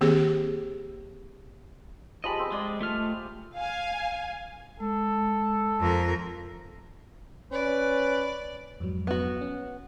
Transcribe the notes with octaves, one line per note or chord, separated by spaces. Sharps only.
D#3 A#3 C4 G4 G#4
F3 G3 G#3 D#5 B5
C4 C5
G#3 C5 D5 D#5
A3 F4 F6
F5 G#5
G#3 A4
F2 A#4
C#4 B4 D5
F2 G#2 F#3
B3 F#4
C#4